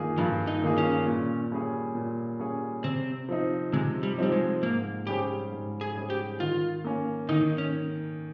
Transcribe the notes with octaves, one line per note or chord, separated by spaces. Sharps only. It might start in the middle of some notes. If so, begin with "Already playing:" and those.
Already playing: G2 D#3 A#3 F4 G#4
G2 F3
D#4
D#3 A#3 F4 G#4
C#4
A#2
G3 C#4 G#4 C#5
A#2
G3 C#4 G#4 C#5
C3 C4
F3 C4 D#4
C3 G#3
G3
F3 G3 C4 D#4
G#3
G#2 A#3
G3 C#4 G4 G#4 C5
G#2
G#4
G3 C#4 G#4 C5
G4
D#3 F4
A#3 C#4
D#3 D#4
C#4